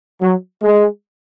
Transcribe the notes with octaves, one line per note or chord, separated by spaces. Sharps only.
F#3
G#3